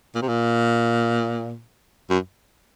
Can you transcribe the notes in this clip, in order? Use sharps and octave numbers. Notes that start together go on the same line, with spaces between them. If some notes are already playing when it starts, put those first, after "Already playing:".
A#2
C3
A#2
F#2